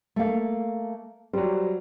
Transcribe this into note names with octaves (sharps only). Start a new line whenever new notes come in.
A3 A#3 F5
F#3 G3 C5